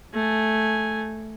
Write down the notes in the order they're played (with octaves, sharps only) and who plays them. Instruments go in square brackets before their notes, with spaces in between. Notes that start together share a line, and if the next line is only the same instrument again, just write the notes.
[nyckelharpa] A3 G#5